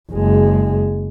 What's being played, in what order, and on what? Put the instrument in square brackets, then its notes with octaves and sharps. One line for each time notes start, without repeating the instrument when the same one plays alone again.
[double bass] F#1 G#3